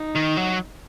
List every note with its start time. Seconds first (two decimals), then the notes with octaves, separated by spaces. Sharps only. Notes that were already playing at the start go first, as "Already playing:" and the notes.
Already playing: D#4
0.15 D#3
0.37 F#3